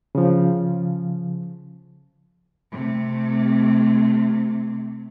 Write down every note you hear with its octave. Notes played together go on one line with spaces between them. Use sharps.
C#3 F3
C3 A3